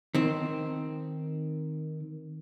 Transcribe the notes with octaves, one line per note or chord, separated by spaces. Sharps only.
D#3 C4